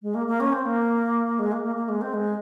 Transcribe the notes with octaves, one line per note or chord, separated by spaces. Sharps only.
G#3
A#3
A#3
C#4
C4
A#3
G#3
A#3
A#3
A#3
G#3
C4
G#3